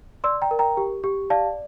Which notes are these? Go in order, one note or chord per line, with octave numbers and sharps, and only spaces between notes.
D5 C6 E6
G5 A#5
A#4
G5 A#5
G4
G4
D5 F5 A5